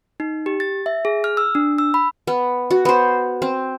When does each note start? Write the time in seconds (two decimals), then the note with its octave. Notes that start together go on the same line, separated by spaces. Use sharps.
0.20 D#4
0.46 G4
0.60 A6
0.86 E5
1.05 G#4
1.24 F6
1.37 E6
1.55 D4
1.78 E6
1.94 B5
2.27 B3
2.71 F#4
2.85 B3 C5
3.42 C4